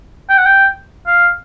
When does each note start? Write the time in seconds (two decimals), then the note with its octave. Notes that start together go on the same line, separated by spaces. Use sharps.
0.29 G5
0.38 F#5
0.46 G5
1.07 F5